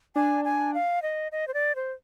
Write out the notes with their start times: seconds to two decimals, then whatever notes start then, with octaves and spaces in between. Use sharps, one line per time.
0.16 D4 G#5
0.45 G#5
0.74 F5
1.02 D#5
1.32 D#5
1.48 C5
1.54 D5
1.76 C5